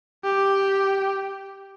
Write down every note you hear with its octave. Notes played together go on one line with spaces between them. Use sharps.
G4